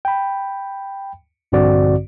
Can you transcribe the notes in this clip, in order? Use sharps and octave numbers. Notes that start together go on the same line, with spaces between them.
G5 B5
A#1 G2 D3 C4 F#4 D5